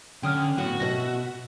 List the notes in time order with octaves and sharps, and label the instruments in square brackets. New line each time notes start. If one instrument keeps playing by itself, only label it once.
[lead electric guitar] D3 [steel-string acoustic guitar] C#4 [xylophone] G5 D#6 F6
[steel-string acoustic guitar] A2 B3 [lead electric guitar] F#4
[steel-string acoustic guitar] B2 C5 E5 [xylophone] A#6